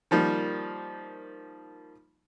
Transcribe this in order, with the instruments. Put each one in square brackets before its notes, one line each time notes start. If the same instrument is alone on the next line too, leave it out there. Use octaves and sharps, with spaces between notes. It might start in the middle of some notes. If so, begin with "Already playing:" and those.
[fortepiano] D#3 F3 G3 A#3